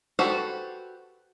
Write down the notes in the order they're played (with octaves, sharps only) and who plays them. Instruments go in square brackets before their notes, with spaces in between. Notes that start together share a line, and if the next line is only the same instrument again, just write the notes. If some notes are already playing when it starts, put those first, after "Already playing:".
[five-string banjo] F#4 G4 A4 B4 C5